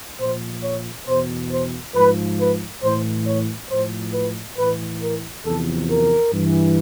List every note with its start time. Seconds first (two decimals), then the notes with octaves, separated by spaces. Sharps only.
0.19 A#2 F3 C5
0.64 C#5
1.07 E2 B2 C5
1.52 C5
1.95 G#2 F3 B4
2.39 B4
2.83 A2 E3 C5
3.26 C#5
3.70 A2 F3 C5
4.14 B4
4.58 A2 E3 B4
5.02 A#4
5.45 E2 C3 F3 A4
5.90 A#4
6.33 G2 E3